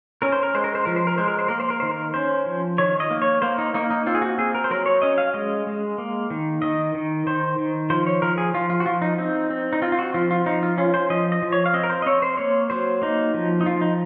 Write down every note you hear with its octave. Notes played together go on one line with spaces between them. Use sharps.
C#4 A#4
C5
A#4
G#3 C5
A#4
C5
F3 A#4
C5
A#4
G#3 C5
A#4
C5
A#3 A#4
C5
A#4
D#3 C5
A#4
C#4 C5
F3
D#3 C#5
D#5
A#3
C#5
A#3 C5
D#4
A#3 D#4
D#4
C4 F4
G#4
F#4
C4 G#4
A#4
C5
F#3 A#4
C#5
C#4 D#5
F5
G#3 D#5
G#3
A#3
D#3
D#3 D#5
D#3
D#3 C5
D#3
F3 C5
C#5
F3 A#4
G#4
F3 F4
F4
F#4
F3 F4
D#4
C4 D#4
C4
D#4
C4 F4
F4
F#4
F3 F4
F4
F3 D#4
F4
C#4 F4
C5
F3 D#5
D#5
F3
C#5
F5
C4 D#5
A#4
C5
D#5
C4 C#5
C5
A#3 C#5
F#3 C5
A#3 D#4
F3
D#4
F3 F4
D#4